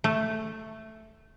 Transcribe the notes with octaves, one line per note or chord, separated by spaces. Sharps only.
A3